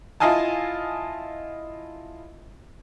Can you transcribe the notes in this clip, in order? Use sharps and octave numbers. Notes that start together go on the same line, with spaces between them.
E4 F4 D#5 F5 G#5 A5